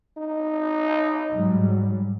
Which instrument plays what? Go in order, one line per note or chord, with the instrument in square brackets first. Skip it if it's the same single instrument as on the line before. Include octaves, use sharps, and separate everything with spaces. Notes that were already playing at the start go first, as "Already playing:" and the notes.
[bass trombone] D#4
[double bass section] G#2 F#3 G3